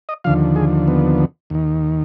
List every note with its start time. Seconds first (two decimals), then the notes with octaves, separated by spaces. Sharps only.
0.09 D#5
0.24 D#2 D3 F3 F5
0.56 G#4
0.88 B3
1.50 D#2 D#3